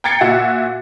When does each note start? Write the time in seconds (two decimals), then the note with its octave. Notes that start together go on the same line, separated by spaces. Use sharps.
0.04 G5 A#5 G#6 A6 C7 C#7
0.21 A#2 F#4 E5